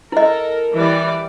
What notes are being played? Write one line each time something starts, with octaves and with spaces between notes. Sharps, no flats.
E4 A4 A#4 D#5
E3 G3 D5